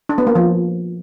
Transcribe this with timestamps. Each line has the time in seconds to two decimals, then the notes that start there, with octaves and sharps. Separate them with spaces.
0.09 D4
0.18 B3
0.27 A#3
0.35 F3